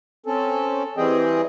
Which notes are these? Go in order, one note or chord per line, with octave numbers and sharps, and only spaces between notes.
C4 C#4 A4
E3 G3 C4 G#4 D#5 G5